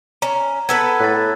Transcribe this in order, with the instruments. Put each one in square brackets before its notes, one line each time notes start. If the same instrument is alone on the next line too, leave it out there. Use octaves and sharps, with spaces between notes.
[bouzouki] C#4 [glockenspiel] A#5
[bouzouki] B3 A4 B4 [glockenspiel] E6 G#6
[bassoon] A2 [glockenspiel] F#6 A6